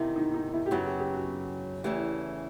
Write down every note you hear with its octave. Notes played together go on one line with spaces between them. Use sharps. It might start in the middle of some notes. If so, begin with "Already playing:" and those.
Already playing: E2 C3 D#3 D#4 E4
D#4
D#4
E4
G4
F#2 C#3 F#3 B3 F#4
G4
G4
F#4
E2 C#3 E3 A3 G4